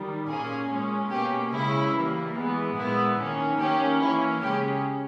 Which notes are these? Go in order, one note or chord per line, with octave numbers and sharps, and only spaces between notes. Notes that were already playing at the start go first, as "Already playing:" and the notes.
Already playing: D#3 G3
A#2 A#3 C#4 G#4
A#2 G#3 C#4
B2 A#3 C#4 G4
C#3 G#3 C#4 E4
E3 G3 A#3
E3 G#3 B3
A#2 G#3 B3 E4
D#3 A#3 C#4
D#3 A#3 C#4 G4
E3 A#3 C#4 E4
C#3 G#3 C#4 G4